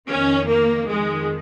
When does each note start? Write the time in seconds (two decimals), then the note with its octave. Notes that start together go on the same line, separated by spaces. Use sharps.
0.08 F2 D#3 C#4
0.49 A#3
0.89 F2 D#3 G#3